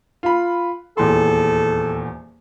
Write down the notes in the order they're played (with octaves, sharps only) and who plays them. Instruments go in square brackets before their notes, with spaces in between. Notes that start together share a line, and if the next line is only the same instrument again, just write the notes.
[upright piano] F4 B5
[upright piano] D#1 E2 C6 [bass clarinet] A4